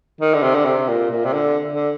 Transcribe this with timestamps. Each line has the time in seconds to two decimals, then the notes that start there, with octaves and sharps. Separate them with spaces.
0.21 D#3
0.34 D3
0.43 C3
0.55 D3
0.65 C3
0.88 A#2
1.11 A#2
1.25 C3
1.33 D3
1.72 D3